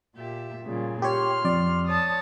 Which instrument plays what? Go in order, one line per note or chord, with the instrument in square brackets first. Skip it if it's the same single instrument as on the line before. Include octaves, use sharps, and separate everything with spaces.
[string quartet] A#2 G4 E5
A#2 C#3 G3
[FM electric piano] G4 C#5 [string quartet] C6 F6
[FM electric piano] F2 D5
[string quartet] C#5 A5 D#6